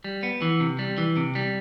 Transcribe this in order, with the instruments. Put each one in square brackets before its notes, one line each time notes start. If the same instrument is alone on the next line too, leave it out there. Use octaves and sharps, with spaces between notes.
[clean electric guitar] G3
B3
E3
C3
G3
E3
C3
G3